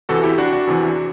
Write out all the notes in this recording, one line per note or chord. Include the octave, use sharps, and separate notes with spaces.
E2 C3 E3 F#4 A4
E4 G4
D4 F#4
D4 F#4
E2 C3 E3